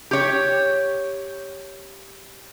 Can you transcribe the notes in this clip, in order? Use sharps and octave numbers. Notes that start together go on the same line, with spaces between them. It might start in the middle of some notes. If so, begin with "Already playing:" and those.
G4 C#5